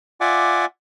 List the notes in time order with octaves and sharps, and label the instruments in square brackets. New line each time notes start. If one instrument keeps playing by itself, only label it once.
[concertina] F4 D5 E5 F#5 G#5 D6